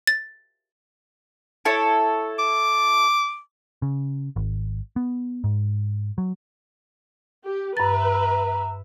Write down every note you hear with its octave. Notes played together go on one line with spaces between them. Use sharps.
A6
E4 A4 C#5
D6
C#3
G#1
B3
G#2
F#3
G4
G2 B4 E5 A#5 A6